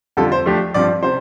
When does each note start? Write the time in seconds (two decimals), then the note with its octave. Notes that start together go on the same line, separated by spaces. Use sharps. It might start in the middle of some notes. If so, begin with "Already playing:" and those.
0.17 F2 D3 G3 F4 A4
0.32 C5
0.46 F3 A3 D4 G4
0.74 G2 F3 C4 D5
1.03 C3 C5